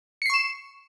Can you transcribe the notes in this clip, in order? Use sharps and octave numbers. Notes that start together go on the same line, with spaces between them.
C#6 C7 C#7 E7